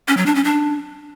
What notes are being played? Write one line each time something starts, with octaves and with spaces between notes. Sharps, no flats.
C#4
F#3
D4
C#4
D4